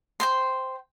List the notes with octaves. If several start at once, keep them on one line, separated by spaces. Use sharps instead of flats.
C5 G5 C6